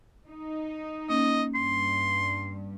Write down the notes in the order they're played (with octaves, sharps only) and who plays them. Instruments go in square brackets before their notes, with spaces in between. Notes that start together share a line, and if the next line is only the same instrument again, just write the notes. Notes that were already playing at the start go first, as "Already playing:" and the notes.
[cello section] D#4
[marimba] A#3 C#4 [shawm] D#5
[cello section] G2 [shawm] C6